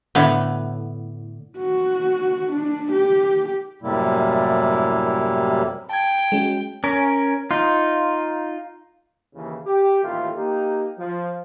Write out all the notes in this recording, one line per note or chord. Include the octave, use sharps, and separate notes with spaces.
A2 D3 B3
F#4
D4
G4
F#2 A2 C3 G3 A#3 E4
G5 A5 G#6
G#3 C#4 F#4
C#4 A#4
D#4 F4
D#2 C#3 E3
G4
A1 D#2 A2 A3 F4
A#3 D#4 G4
F3